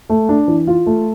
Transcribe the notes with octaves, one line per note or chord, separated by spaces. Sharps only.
A3
D4
E3
F4
A3